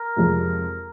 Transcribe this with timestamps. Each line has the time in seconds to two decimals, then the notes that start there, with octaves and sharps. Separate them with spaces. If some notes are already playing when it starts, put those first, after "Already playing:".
Already playing: A#4
0.16 F2 C3 F3 G#3